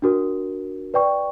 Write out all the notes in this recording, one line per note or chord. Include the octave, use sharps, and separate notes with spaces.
D4 F#4 A#4
B4 D5 G5 C#6